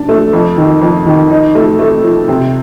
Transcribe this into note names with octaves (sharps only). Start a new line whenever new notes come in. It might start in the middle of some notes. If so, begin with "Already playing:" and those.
Already playing: D4
A3
F2
D#3
F2
D#3
D#4
A3
A3
F3
C3